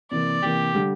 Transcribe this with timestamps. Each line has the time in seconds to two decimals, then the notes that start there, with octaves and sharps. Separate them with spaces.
0.11 C3 E3 A#3 D5
0.43 C3 E3 A#3 G4
0.75 D3 G3